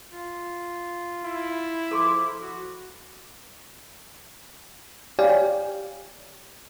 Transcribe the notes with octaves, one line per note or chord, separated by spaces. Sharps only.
F4
E4
F3 A4 C6 D6
F#4
G4 C#5 D5 F5 G5 G#5